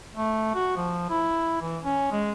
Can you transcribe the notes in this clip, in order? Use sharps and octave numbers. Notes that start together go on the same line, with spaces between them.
A3
F#4
F3
E4
E3
C#4
G#3